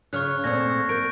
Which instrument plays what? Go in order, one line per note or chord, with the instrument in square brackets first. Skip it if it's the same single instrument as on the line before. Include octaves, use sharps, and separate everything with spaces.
[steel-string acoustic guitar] C#3 C#5 [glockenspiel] C#6 F6 F#6
[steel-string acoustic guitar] A#2 A3 C4 [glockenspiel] C#6 G#6 A#6
[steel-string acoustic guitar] A#4 [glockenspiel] G6 D7